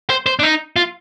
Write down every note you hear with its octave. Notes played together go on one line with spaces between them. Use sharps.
C5
C5
D4
D#4
F4